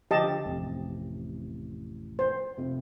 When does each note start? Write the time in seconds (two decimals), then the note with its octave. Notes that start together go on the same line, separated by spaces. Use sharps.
0.11 D3 F3 G4 D#5 A5
0.45 A1 F2 C3
2.19 C5
2.58 F1 F2 C3